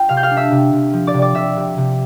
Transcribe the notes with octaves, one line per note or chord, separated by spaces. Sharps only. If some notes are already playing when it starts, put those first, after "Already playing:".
Already playing: F4 G5
C3 F5 F6
G6
F5 F6
D4
E5 E6
C3
C3
F3
D5 D6
C3
D5 D6
C3 E5 E6
C3
C3